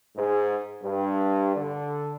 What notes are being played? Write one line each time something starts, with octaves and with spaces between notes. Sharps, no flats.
G#2
G2
D3